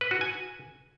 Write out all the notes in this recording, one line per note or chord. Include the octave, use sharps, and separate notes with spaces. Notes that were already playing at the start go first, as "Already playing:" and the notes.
B4
F#4
G#5